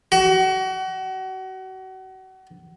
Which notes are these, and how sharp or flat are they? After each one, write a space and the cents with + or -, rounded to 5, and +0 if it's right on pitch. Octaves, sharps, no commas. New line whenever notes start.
F#4 +35